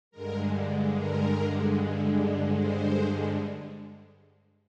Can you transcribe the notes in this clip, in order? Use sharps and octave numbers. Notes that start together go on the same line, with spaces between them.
G2 D3 G#3 A#4
A#4
C5